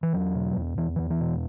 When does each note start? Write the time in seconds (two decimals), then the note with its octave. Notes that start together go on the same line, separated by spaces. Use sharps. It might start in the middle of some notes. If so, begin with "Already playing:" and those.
0.03 E3
0.13 E2 F#3
0.35 B2
0.57 E2
0.77 E2 E3
0.96 E2 E3
1.10 E3
1.21 B2